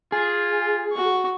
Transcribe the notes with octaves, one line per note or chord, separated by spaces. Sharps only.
F4 G#4
F#4 C#6